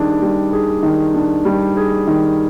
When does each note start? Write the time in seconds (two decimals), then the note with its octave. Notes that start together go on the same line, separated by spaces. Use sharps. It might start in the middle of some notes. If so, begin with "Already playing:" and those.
Already playing: D#3 G3 D4 G#4
0.22 G3
0.53 G#4
0.83 D#3
1.14 D4
1.45 G3
1.77 G#4
2.07 D#3